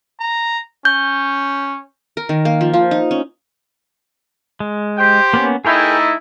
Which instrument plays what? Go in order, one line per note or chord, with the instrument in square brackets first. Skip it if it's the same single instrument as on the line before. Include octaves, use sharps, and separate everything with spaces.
[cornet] A#5
[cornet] C#4 [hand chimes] G6
[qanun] A#4
D#3
A#3
F3
F3
D#4
C#4
[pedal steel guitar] G#3
[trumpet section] G4 C5 G5
[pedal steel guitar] A#3 B3 C#4
[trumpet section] A3 D#4 E4 [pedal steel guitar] G#4 A#4 G5